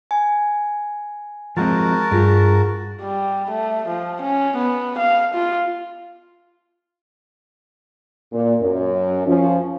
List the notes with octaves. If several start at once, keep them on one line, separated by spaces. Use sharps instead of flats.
G#5
F3 G#3 C4 F#4 A#4 A5
G2 F4 G#4 D7
G3
A3
F3
C#4
B3
F5
F4
A#2
F#2
F3 C#4